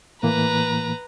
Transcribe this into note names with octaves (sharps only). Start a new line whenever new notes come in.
A2 E3 A#3 B4 A#5